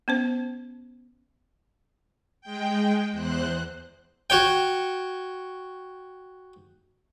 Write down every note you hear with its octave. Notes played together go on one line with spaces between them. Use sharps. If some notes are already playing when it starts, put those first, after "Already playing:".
B3 C#4 C5
G#3 G5
E2 C5 F#6
F#4 C#5 G5